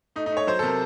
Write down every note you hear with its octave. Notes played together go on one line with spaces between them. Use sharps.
A3 D#4
D#4
A3 C#5
F#3 C5
A4
C3 A#4